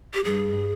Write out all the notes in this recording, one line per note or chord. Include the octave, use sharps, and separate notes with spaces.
G4
G2 G#4